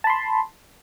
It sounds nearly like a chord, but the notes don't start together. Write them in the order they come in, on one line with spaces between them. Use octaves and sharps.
A5 B5 C6